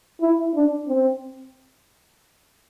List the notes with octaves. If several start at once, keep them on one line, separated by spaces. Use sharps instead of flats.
E4
D4
C4